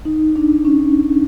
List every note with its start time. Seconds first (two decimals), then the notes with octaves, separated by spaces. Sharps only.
0.05 D#4
0.36 D4
0.65 C#4